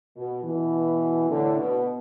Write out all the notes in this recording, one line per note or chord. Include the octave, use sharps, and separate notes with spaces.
B2
B2 E3
A2 D3
B2